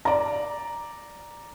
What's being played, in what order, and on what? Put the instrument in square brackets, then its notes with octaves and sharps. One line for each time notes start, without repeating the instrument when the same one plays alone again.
[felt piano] D5 A#5